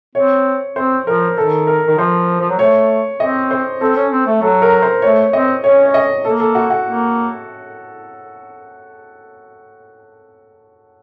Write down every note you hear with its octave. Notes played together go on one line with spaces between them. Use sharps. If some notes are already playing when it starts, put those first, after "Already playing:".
C4 C#5
C4 C5
F3 A#4
D#3 A4
A#4
D#3
F3 C5
F3
F#3
A3 C#5
C4 D#5
C5
C4 A4
C#4
C4
A3
F#3 A4
A#4
C5
A3 C#5
C4 D#5
C#4 C#5
C#5
D#5
A#3 A4
A4
F#4
F#4
A#3